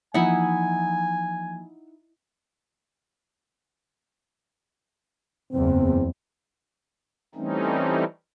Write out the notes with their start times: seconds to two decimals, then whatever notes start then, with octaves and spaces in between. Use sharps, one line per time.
0.14 E3 F3 A#3 D#4 E4 F#5 G#5
5.52 F#1 E2 C4
7.35 E3 G3 A3 C4 C#4 D#4